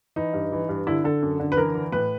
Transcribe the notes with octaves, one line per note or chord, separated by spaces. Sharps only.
E3 D#4
G2
E3
G2
D3 E4
D3 A4
F#2
D3
B4
E3 A#4
E3
A2 B4